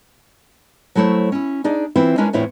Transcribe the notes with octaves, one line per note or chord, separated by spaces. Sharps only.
F#3 A3 E4 C5 C#5
C#4 E4
D4 D#4 G#4 D5
E3 C4 E4 F4
G#3 C#4 D4 E4 A#4 B4
E2 A2 C4 E4 F4 C#5